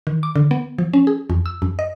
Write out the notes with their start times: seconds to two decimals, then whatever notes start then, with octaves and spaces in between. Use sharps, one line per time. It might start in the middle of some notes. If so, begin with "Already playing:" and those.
0.07 D#3
0.23 D6
0.36 D3
0.51 B3
0.78 F3
0.93 C#4
1.07 G#4
1.30 F2
1.46 E6
1.62 F#2
1.79 D#5